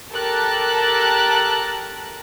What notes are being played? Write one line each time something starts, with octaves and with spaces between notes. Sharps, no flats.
G4 A4 A#4 A5 A#5 F#6